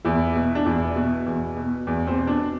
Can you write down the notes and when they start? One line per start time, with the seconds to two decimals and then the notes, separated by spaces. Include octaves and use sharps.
0.05 E2 E4
0.35 B2
0.55 D4
0.66 E2 E4
0.96 B2
1.26 E2
1.56 B2
1.87 E2
2.07 C4 C5
2.18 B2
2.27 D4 D5